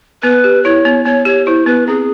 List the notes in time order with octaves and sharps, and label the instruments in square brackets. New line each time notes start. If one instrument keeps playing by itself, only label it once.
[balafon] B3 [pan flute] B4
[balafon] G4
[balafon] E4 [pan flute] C#5
[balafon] B3
[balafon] B3 [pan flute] C#5
[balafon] G4 [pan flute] C#5
[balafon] E4 [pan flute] C5
[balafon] B3 [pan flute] B4
[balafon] C4 [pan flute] G#4